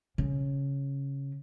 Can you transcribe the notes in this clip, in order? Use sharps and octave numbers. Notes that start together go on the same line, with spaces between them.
C#3